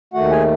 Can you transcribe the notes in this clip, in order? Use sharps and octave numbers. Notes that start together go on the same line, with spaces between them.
D#2 D#3 A3 F#4 F#5
G#4 G#5